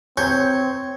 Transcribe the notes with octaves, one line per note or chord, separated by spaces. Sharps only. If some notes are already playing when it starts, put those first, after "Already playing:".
C4 C#5 G6